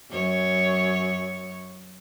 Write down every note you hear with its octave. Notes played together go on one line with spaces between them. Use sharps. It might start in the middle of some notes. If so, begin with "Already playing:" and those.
F#2 C#5